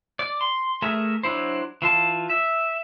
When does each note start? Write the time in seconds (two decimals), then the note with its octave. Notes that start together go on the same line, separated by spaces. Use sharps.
0.19 D5
0.41 C6
0.82 A3 G#4 A#4 E5
1.23 F#3 D4 E4 C5
1.82 E3 F4 A5
2.30 E5